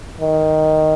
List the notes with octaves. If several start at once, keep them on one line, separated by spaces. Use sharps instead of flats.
D#3